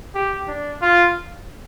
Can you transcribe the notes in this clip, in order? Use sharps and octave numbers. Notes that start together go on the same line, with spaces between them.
G4
D4
F4